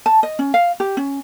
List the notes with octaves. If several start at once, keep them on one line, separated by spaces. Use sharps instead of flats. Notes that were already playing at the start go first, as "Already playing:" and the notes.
A5
D#5
C#4
F5
G4
C#4